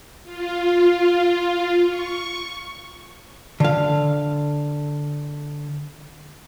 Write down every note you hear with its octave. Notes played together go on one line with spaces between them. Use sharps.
F4
C#6
D3 F5